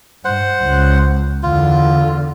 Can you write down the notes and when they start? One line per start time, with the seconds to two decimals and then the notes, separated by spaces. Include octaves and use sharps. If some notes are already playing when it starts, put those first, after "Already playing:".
0.25 G2 C5 F#5
0.64 C#2
1.43 E2 D3 F4